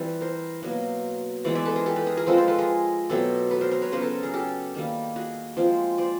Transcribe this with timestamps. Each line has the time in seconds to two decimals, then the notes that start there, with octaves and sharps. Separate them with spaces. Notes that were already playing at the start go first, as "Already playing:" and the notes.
Already playing: E3 G3 C4
0.21 A#4 C5
0.62 B2 F#3 A#3
1.44 E3 G#3 B3 C5 D5
1.55 D5 E5
1.65 A4 B4
1.76 G#4 A#4
1.86 G4 A4
1.96 A4 B4
2.06 G#4 A#4
2.17 G#4 A#4
2.27 F3 G#3 C4 A4 B4
2.38 A#4 C5
2.48 A4 B4
2.58 G#4 A#4
3.09 B2 F#3 A3 C4 G4 A4
3.51 A4 B4
3.61 A#4 C5
3.71 A#4 C5
3.82 B4 C#5
3.92 C#3 F#3 B3 A#4 C5
4.02 A4 B4
4.23 G#4 A#4
4.34 G4 A4
4.74 D#3 G3 A#3
5.16 F#4 G#4
5.57 F3 G#3 C4
5.98 C5 D5